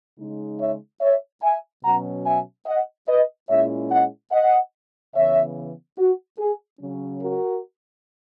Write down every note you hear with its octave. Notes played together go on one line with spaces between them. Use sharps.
C#3 G#3 D#4
C#5 E5
C#5 E5
E5 G#5
B2 F#3 C#4 F#5 A#5
E5 G#5
D#5 F#5
B4 D#5
A#2 G#3 C#4 E4 C#5 E5
D#5 F#5
D#5 F#5
C#3 E3 B3 C#5 E5
F#4
G#4
C#3 F#3 C#4
F#4 A#4